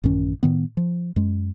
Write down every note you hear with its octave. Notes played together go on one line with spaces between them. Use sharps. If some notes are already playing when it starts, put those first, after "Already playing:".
A1 F#2 D#3 C#4
A2 D#3 B3
F3
F#2 G#3